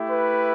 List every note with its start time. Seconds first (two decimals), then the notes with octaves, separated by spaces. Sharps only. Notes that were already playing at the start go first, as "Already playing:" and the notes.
Already playing: A3 E4 G4
0.10 B4